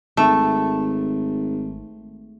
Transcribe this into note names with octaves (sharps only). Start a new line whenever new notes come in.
G#1 A3